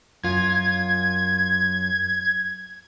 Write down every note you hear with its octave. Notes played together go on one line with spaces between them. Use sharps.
F#2 F4 G#6